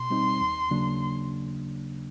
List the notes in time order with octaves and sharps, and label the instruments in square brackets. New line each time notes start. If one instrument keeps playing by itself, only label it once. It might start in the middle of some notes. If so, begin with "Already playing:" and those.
Already playing: [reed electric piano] B2 [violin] C6
[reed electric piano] G3 C4 D#4
D#2
C#3 F#3 A#3 D4